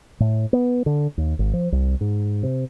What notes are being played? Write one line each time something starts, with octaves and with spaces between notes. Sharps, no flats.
A2
B3
D3
D#2
G#1
F3
C2
G#2
C3